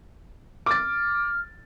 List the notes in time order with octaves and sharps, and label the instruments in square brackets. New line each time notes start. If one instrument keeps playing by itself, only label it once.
[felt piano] D6 A6 [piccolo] F6